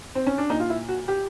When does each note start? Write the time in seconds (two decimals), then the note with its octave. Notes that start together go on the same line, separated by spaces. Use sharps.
0.15 C4
0.27 C#4
0.38 D4
0.50 A#2 D#4
0.60 F4
0.70 E4
0.89 F#4
1.08 G4